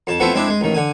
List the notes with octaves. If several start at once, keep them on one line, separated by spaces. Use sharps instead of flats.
F2 A5
F3 A3 B3 C4 E4
G#3 C4 D4 E4
G#3
A1 D#3
D3 G#5